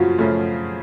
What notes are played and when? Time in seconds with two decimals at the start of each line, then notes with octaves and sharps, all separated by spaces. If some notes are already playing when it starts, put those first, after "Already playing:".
Already playing: F#2 C#3 F3 F4 F#4
0.18 F#2 C#3 F3 A3